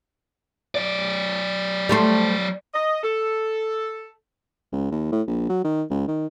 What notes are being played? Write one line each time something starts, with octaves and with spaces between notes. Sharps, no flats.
F#3 D5
G3 A3 C5
D#5
A4
C#2
D#2
A2
A#1
F#3
D#3
C#2
D#3